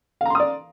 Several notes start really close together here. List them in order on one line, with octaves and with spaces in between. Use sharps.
F5 A#5 C6 D#6 D5